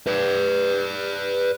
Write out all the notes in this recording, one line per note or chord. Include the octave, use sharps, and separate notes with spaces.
B4 D5